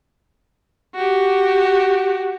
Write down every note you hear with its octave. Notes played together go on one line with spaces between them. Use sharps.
F#4 G4